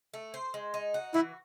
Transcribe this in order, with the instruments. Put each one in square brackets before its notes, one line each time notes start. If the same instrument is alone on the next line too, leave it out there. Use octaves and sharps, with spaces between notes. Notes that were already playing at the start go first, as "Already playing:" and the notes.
[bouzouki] A3
C5
G#3
D#4
F#4
[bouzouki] E3 [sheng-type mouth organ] E4